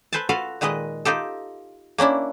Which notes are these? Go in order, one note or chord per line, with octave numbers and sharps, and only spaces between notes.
A4 B4 C5 G#5 A5
F4 F#4 A4 B4 F5
A#2 D#3 G#3 B4 D#5
D#4 F4 G4 A4
A#3 C#4 D4 E4